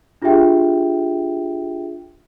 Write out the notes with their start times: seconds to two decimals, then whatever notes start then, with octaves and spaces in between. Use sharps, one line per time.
0.22 D4 F4 G4 G#4 E5 G5